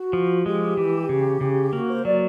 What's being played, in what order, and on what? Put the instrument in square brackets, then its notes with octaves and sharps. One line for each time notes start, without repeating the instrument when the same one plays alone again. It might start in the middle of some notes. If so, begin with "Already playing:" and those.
Already playing: [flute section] F#4
[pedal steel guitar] F3
[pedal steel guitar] G#3 [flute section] G4
[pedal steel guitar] E3
C#3
C#3
[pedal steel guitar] A#3 [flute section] F#4
[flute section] C5
[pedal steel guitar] F#3 [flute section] D5